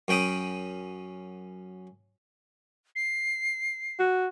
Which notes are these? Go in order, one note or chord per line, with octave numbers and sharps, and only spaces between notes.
F#2 C#4 G5 B5 D#6
C7
F#4